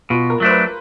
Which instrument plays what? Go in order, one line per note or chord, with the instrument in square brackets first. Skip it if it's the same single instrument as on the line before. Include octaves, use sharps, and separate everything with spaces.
[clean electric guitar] B2 [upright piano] F4
[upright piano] A#4
[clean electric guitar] F#3 A3 D4 [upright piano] C5
[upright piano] B4